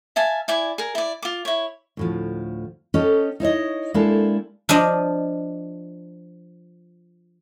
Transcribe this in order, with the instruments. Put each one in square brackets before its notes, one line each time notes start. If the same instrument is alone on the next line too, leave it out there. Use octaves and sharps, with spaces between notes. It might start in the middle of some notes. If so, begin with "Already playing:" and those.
[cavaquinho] E5 F5 G#5 A5
E4 D5 G#5
G#4 A#4
E4 D5
F4 D6
E4 C#5
[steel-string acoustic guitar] D2 A2 F3
C#4 G4 A4 D#5
D#4 E4 C#5 D#5
G#3 A#3 D4 E4 G4 A4
[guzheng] F3 D4 F4 D#5